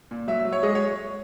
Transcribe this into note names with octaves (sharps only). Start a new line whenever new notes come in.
A#2
F#3 E5
F#3
C#5
G#3 D#5
C#5